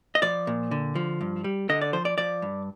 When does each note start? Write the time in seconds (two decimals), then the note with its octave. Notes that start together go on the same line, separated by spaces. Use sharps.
0.15 D#5
0.22 F3 D5
0.47 A#2
0.71 D3
0.95 F3
1.21 G2
1.44 G3
1.69 D3 D#5
1.81 D5
1.93 F3 C5
2.05 D5
2.18 F3 D5
2.42 G2